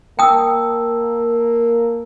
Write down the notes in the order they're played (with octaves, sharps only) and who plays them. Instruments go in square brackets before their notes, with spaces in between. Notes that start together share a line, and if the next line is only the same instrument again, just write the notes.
[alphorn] A#3 [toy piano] G5 D#6 [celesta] A5 E6